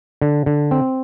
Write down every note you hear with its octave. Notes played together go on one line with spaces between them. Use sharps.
D3
D3
C4